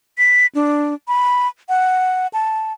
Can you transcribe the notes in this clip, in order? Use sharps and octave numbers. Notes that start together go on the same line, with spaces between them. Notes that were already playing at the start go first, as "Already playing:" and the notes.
B6
D4
B5
F#5
A5